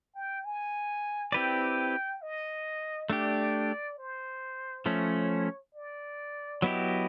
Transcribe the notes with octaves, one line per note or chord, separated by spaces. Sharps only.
G5
G#5
C4 E4 G4 B4 D5 G5
D#5
A3 D4 G4 D5
C5
F3 A3 C#4 C#5
D5
F#3 B3 E4 G4 D#5